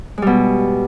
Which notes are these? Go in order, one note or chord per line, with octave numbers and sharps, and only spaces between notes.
B2 G3 G#3